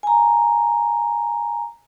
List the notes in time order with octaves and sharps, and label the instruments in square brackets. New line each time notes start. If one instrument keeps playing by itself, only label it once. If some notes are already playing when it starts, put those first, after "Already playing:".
[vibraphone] G#5 A#5